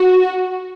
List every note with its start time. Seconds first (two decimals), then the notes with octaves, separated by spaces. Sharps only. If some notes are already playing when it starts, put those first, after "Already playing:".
Already playing: F#4